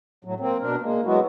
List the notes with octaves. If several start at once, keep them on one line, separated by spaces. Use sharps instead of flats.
A2 F#3
A#3 C4
B2 D4 A#4
G#3 A#3
F#3 G#3 B3 E4 F#4